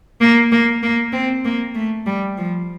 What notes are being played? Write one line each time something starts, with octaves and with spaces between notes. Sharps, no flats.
A#3
A#3
A#3
C4
A#3
A3
G3
F3